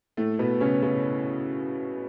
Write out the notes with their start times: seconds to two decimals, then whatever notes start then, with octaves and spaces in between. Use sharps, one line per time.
0.17 A2 A3
0.39 B2 B3
0.60 C#3 C#4
0.82 C#3 C#4